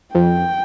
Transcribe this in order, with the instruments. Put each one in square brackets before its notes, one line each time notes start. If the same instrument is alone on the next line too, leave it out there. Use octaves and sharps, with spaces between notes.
[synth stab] F2 [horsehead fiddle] G5